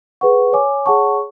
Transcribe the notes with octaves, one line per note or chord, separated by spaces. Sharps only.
G#4 B4 F#5 C#6
C#5 G#5 D6
G#4 C#5 F#5 A5 C#6